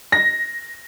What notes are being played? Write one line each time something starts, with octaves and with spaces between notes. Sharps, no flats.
A#6